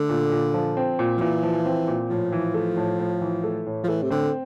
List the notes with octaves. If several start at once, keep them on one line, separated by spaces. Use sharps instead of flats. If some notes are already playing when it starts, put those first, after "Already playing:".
Already playing: D3 A3
A#2
A#2
F3
C4
A#2
F3
A#2 E3
F3
C4
A#2
A2 F3
E3
A3
A2
A2
E3
A3
A2
F3
E3 A3
C3
D3 C4